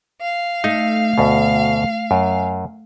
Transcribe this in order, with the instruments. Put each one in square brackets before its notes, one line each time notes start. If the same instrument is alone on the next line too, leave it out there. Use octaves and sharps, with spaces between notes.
[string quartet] F5
[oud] A3 [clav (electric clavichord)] D#4
[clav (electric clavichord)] D2 B2
F#2